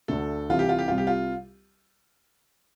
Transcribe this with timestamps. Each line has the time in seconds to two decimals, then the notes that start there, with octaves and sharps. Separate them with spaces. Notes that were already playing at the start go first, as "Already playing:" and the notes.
0.08 D2 D3 A3 A4
0.50 C2 C3 E3 G3 F4
0.59 G4
0.69 F4
0.79 G4
0.88 C2 C3 G3 F4
0.98 G4
1.07 F4